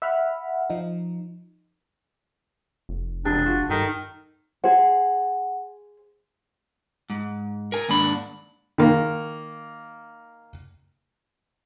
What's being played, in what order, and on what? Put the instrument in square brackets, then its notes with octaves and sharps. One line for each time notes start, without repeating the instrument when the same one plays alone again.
[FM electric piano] E5 F#5 B5 F6
F3 D#4
[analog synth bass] F1
[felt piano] E1 C3 G#4 [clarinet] D4
[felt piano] F4 F#4
[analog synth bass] G2 [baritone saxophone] D#3 [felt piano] A4
[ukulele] G#4 C5 [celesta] F#5
[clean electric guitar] G#2
A#4 G#5
D#2 G#2 D4 B5
[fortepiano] D#3 A#3